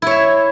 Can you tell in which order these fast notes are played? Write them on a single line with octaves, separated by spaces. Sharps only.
E4 C#5 E5